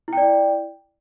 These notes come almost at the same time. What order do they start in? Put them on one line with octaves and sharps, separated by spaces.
E4 G5 D5